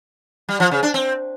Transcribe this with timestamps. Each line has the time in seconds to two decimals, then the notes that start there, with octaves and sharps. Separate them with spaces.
0.49 G3
0.60 F3
0.71 C#3
0.83 D4
0.94 C4